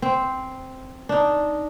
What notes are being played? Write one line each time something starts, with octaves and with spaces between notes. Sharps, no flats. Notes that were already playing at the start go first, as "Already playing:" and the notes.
C4
D4 D#4